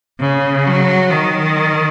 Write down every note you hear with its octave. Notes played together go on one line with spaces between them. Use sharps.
C#3
F#3
D#3